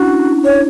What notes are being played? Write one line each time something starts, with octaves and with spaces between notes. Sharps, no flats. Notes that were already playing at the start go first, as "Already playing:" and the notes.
Already playing: C#4 D4 E4 F#4
C#5